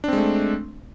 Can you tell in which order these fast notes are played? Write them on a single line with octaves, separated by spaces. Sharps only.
D4 C4 G#3 A3